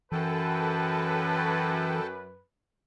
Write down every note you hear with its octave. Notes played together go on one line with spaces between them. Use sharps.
F#2 E3 A4 B4 G5 A5